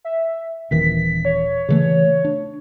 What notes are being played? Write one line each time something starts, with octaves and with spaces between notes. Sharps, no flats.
E5
D#1 D#3 E3 B6
C#5
C#3 E3 A3
D4